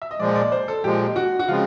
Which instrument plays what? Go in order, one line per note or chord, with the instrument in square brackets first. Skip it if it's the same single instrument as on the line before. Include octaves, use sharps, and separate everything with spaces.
[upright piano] E5
D#5
[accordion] A#2 F3 G#3 [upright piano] D5
[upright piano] D5
C5
A4
[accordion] A#2 F3 G#3 [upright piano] G4
[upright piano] F#4
F#4
[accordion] C#3 F3 G#3 C4 [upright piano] F4